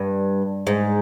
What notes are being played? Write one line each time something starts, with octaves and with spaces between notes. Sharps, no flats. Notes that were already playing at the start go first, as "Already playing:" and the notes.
Already playing: G2
G#2